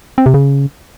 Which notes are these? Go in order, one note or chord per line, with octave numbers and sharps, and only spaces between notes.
C4
C3
C#3